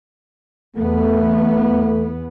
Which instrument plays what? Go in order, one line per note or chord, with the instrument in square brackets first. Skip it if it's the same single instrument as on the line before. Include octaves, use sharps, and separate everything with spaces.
[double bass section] E2 B3 [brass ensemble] A3